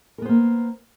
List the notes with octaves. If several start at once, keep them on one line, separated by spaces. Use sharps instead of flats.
A#3 B3 A#4 C5